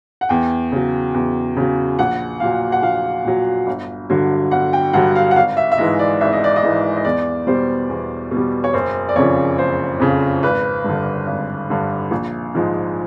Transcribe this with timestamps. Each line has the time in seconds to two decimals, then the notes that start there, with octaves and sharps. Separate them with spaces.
0.21 F#5
0.29 E2 G5
0.72 C#3 F#3
1.14 E2
1.57 C#3 F#3
1.99 A#1 F#5
2.40 A#2 F#3 F5
2.72 F#5
2.82 A#1 F5
3.25 A#2 F#3
3.67 G1
4.10 G2 D3 F#3
4.51 G1 F#5
4.73 G5
4.93 G2 D3 F#3 F#5
5.15 F5
5.31 F#5
5.36 G#1 F5
5.57 E5
5.72 E5
5.78 G#2 E3 G#3 D#5
5.99 D5
6.21 G#1 E5
6.33 D#5
6.44 D5
6.56 D#5
6.63 G#2 E3 G#3
6.97 D#5
7.05 E2 D5
7.47 B2 G3 C5
7.89 E2
8.31 B2
8.37 G3
8.64 C#5
8.73 F#1 C5
9.09 D5
9.16 F2 C#3 F3 C#5
9.58 F#1 C5
10.00 F2 C#3 F3
10.43 G#1 B4
10.84 G2 D3
11.27 G#1
11.70 G2 D3
12.11 A#1
12.54 G#2 F3 G#3